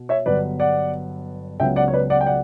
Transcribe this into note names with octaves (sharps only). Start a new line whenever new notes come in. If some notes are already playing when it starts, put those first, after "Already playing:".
Already playing: B2
C#5 E5
G1 G2 F#3 B3 B4 D5
D5 F#5
C#2 C#3 F#3 B3 E5 G5
D5 F#5
C#5
B4 D5
D5 F#5
G5
D5 F#5